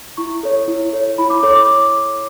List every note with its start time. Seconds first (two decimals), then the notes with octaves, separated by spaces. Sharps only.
0.17 E4 C#6
0.43 A4 C#5
0.68 E4
0.93 A4 C#5
1.18 E4 B5
1.30 D6
1.43 A4 C#5 D6
1.55 D6